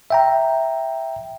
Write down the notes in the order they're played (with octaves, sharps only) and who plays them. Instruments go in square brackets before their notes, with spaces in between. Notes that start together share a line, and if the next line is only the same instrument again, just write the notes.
[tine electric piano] E5 G5 A#5